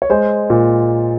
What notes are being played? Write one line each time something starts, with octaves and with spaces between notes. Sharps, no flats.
C#5
G#3 C5
A#2